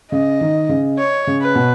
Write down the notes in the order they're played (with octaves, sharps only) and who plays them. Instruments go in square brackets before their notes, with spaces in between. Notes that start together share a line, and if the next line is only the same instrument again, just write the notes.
[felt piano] C#3 [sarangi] D#5
[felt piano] D#3
C#3
[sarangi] C#5
[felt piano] C#3
[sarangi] B4
[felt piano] B2